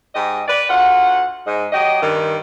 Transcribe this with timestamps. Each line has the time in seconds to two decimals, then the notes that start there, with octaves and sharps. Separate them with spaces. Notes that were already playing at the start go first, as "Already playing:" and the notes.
0.15 G#2 G4 D#5
0.48 B4 D5
0.70 D2 F4 F#5
1.47 G#2 D#5
1.73 F#3 G4 D#5
2.02 G2 D#3